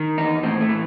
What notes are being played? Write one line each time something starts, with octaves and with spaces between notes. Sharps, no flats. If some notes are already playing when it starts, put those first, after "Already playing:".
Already playing: D#3
E2 D#4
A2 C4
A3
E3